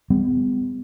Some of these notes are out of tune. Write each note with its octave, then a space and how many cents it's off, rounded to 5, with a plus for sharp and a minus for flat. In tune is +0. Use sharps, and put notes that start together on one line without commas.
G3 +40 B3 +35